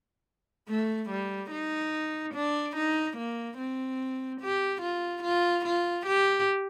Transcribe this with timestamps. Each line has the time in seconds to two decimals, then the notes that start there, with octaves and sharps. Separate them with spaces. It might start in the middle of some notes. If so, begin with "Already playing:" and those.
0.69 A3
1.10 G3
1.51 D#4
2.35 D4
2.76 D#4
3.18 A#3
3.58 C4
4.41 G4
4.82 F4
5.23 F4
5.66 F4
6.07 G4